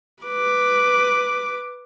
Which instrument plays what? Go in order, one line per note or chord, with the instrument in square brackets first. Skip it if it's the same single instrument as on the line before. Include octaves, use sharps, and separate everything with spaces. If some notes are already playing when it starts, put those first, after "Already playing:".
[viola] B4 D6